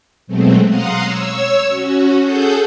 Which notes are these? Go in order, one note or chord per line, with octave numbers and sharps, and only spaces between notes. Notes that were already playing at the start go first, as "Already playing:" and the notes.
B2 F#3 G#3 A3 C4
F5 F#5 A#5 C6 D#6
C#5 E6
C#4 F#4
G#4 A4 F#5 G6